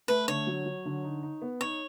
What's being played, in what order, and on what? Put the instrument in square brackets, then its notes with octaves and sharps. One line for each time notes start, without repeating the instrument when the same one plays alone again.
[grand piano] A3 [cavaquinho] B4
[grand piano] D3 [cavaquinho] C#5
[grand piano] F#3
F#3
D3
D#4
D#4
B3
[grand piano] D#4 [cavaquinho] C#5